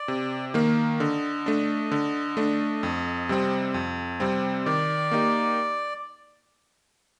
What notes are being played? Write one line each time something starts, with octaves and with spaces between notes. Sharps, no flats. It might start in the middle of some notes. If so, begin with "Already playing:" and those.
Already playing: D5
C3
D#3 A#3
D3 D#5
A3 D4
D3
A3 D4
F2
C3 G3 C4
F2
C3 G3 C4
D#3 D5
A#3 D#4 G4